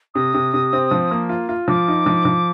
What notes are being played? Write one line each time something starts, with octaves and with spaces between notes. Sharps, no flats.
C3 D#6
C3
C3
C4
F3
A#3
F4
F4
F3 D6
D#4
F3
F3